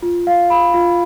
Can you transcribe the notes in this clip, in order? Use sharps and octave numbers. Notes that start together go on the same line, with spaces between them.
F4
F5
B5
F4